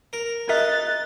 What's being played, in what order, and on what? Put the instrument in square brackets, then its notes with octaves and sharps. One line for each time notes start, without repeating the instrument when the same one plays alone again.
[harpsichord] A#4
[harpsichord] D#4 [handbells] A#4 E5 [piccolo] F#6 [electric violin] A6